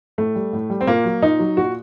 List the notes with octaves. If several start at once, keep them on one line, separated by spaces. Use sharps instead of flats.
A2 A3
G3
A2
G3
C4
A#2 A#3
F#3
A#2 D#4
F#3
A#2 F#4